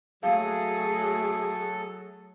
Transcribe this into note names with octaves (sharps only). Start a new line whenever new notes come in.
F#3 A3 G#4 A4 F5